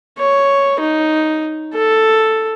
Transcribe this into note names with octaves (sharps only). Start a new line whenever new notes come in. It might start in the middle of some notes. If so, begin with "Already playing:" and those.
C#5
D#4
A4